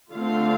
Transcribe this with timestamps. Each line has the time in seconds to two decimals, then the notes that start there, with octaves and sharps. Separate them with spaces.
0.12 D3 A3 C4 F4 F5